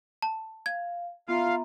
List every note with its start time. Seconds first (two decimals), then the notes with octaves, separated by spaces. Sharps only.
0.22 A5
0.66 F5 G#6
1.28 B3 F4 E5 F5 A#5